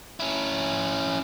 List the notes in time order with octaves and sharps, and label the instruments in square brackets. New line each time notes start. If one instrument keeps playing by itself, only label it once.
[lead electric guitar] C#4 E4